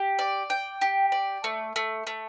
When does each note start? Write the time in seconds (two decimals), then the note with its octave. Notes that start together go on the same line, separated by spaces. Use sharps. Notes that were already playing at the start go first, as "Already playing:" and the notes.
Already playing: G4
0.19 D5
0.50 G5
0.81 G4
1.12 D5
1.44 A3
1.76 A3
2.07 A3